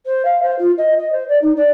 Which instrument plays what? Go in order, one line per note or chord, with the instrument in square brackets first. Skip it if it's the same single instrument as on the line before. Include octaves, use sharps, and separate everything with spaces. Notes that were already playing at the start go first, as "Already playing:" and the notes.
[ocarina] C5
F5
C5
F4
D#5
D#5
C5
D5
D#4
D5